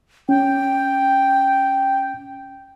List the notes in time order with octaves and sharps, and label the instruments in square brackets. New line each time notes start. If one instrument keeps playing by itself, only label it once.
[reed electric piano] C#4 [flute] G5